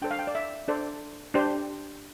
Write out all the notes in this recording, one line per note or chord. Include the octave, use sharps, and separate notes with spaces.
D4 A4 C5 G5
F5
G5
D5
E5
D4 A4 C5 D5
D4 G4 C5